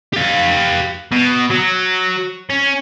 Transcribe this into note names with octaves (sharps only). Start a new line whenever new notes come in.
G4 F5
B2
F#3
C#4